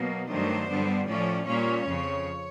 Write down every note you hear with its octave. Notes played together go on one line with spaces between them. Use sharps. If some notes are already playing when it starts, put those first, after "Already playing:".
Already playing: B2 F#3 A#3
G2 D#3 F#3 A3 D4 C5
G2 D3 G3 B3
A2 F3 A3 C#4 D5
A#2 G3 A#3 C#4 C#5
F2 C#3 F3